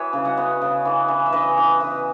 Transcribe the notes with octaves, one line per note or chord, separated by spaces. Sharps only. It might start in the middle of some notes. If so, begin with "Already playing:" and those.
Already playing: E3 F#4 G#4 B4 C#5 E5
C#3
D#5 F#5
B3
C#3
E3
E3
E5
E3 B4 D#5
E3
E3